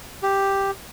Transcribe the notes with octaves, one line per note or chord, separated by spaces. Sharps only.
G4